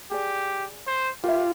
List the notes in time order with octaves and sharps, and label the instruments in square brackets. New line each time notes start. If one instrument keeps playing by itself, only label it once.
[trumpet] G4 [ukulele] G#4 D5
[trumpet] C5
[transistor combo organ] F4 [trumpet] G4 [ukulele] A#4 E5